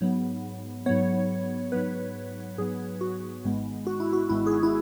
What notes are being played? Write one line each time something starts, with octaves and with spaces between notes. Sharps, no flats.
G#2 F#3 B3
G#2 F#3 B3 C#5
G#2 F#3 B3 B4
G#2 F#3 B3 G#4
F#4
G#1 G#2 G#3 B3
F#4
E4
F#4
G#1 G#2 G#3 B3 E4
G#4
F#4
E4